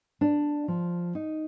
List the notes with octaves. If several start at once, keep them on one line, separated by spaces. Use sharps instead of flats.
D4
F3
D#4